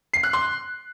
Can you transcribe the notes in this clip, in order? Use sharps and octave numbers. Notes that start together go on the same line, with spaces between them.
C7
F#6
C6